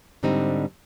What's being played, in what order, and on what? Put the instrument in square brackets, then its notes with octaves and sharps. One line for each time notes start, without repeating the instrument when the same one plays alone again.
[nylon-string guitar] G#2 D3 G3 C4 D4 D#4